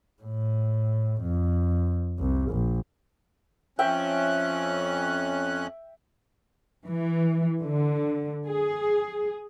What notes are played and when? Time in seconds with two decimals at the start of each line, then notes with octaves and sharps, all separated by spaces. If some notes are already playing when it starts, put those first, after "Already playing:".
0.22 A2
1.21 F2
2.19 C2
2.50 A#1
3.79 F2 C#4 E5 G5 F#6
6.87 E3
7.62 D3
8.48 G#4